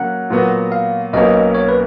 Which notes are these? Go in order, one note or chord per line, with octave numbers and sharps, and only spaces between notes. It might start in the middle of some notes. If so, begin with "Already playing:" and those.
Already playing: C#3 F#3 A#3 F#5
A#2 F#3 B3 F#4
F5
B1 B2 F#3 A#3 C#4 D#5
C#5
B4